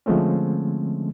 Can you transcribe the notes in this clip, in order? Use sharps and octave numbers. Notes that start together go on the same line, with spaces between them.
D3 F3 G#3 A3 C4 C#4